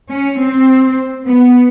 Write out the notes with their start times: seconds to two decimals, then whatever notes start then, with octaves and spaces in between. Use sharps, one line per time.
0.09 C#4
0.39 C4
1.28 B3